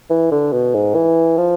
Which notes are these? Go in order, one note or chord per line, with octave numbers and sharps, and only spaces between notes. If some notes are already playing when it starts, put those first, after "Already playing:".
E3
D3
B2
G#2
E3
F3